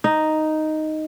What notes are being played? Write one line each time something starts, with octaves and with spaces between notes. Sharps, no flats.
D#4